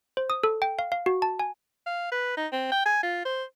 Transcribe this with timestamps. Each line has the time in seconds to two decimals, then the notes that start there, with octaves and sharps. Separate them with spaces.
0.17 C5
0.30 D#6
0.44 A4
0.62 G5
0.79 F5
0.92 F5
1.06 F#4
1.22 A5
1.39 G#5
1.87 F5
2.12 B4
2.37 D#4
2.52 C4
2.72 G5
2.86 G#5
3.03 F4
3.25 C5